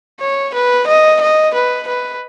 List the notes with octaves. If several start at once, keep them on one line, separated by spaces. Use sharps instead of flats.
C#5
B4
D#5
D#5
B4
B4